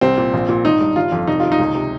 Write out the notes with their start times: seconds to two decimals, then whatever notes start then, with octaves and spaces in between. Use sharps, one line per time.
0.01 C2 C4
0.17 A#2
0.33 A#1
0.49 A#2
0.65 G#1 D#4
0.81 G2
0.96 G1 F4
1.12 F2
1.27 F1 D#4
1.40 D#2 F4
1.52 D#4
1.59 C#2
1.75 C3